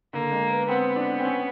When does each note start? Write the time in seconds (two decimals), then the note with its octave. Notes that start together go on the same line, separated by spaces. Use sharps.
0.13 D3 A#3
0.31 G#3
0.50 B3
0.68 B3 C4
0.96 D4
1.19 C4
1.25 C#4